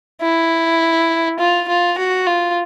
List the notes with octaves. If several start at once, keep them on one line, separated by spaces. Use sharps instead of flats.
E4
F4
F4
F#4
F4